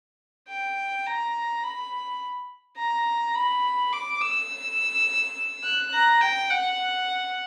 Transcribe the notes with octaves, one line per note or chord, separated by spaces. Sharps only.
G5
A#5
B5
A#5
B5
D6
E6
F#6
A#5
G5
F#5